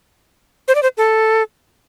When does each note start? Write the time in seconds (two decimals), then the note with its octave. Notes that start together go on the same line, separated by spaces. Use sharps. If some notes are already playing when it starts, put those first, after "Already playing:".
0.68 C5
0.75 D5
0.83 C5
0.97 A4